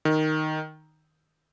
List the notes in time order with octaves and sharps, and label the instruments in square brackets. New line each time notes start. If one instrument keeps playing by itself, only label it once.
[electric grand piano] D#3